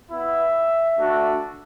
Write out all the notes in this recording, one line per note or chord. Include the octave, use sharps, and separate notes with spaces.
B3 E4 E5
A3 D4 F#4